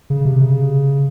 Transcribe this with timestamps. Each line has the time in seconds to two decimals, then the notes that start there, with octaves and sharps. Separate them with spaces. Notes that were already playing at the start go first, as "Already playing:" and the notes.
0.10 C#3
0.25 C3
0.41 C#3